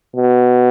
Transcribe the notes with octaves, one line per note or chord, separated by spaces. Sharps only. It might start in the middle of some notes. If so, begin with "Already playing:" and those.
B2